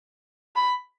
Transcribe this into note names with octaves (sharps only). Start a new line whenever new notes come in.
B5